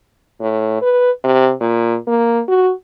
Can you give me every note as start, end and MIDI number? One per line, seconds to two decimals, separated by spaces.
0.41 0.77 45
0.82 1.11 71
1.24 1.52 48
1.61 1.96 46
2.07 2.41 58
2.48 2.71 66